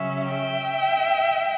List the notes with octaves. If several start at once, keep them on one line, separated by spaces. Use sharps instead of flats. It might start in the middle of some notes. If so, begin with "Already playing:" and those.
Already playing: C#3 F#3 C#4 E5
E5 G5